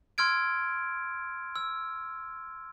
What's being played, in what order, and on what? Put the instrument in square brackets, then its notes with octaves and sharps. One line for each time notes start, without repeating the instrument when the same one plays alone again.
[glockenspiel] C6 E6 F6 G#6 D7
E6